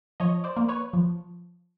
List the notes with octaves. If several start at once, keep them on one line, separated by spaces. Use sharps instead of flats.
F3 C#5 D#5
C5 D5
A#3
B4 C#5
F3